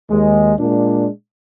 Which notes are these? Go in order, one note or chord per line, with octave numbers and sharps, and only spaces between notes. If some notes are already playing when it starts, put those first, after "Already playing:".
D#2 G#3
A#2 G#3 D4